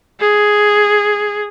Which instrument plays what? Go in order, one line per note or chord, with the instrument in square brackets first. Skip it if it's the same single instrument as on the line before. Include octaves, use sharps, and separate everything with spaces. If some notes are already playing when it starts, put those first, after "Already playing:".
[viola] G#4